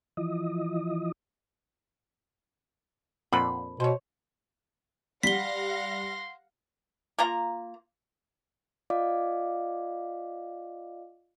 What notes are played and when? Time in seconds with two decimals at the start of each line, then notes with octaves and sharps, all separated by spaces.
0.17 E3 F3 D#5
3.32 F2 A#2 D4 C5 F#5 B5
3.80 B2 C5 C#5
5.23 G3 F5 F#5 C6 A#6 B6 G7
7.19 A#3 F4 A#5
8.90 F4 D5 D#5 F5 D6